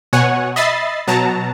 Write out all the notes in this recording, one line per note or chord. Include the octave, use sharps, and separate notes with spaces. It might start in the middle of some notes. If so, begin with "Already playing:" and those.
B2 C#5 F#5 G#5
D#5 E5 B5 A6 C7
B2 F#3 A5 A#5